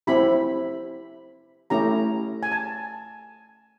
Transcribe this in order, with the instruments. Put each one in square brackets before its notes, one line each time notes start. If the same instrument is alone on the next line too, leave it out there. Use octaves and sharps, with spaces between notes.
[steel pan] C4 E4 G4 B5
A3 C#4 E4 G4 A#5
G#5
A5